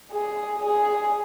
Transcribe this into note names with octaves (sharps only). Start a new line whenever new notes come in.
G#4
G#4